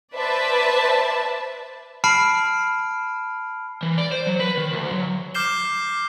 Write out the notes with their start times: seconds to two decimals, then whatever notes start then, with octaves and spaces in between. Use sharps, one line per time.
0.14 B4 C5 D5 E5 A5
2.04 A5 B5 F6 C7 D7
3.83 E3
3.98 D5
4.12 C5
4.27 F#3
4.40 B4
4.58 D#3
4.73 D2
4.92 F#3
5.35 D6 F6 G6 C7 E7 G7